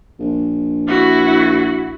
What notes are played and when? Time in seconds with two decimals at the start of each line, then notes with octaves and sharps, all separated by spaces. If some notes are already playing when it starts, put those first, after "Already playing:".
0.20 A#1
0.88 E4 F#4